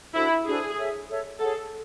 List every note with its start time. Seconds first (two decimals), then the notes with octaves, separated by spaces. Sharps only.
0.14 D4 E4 F#4 A4 C5
0.45 D4 F#4 G#4 A4 C5
0.77 A4 C#5 E5
1.08 A4 C#5 E5
1.39 G#4 A4 C#5 F#5